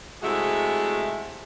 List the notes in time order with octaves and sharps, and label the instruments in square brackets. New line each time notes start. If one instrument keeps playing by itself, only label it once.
[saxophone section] C3 G#3 A3 E4 F#4 G#4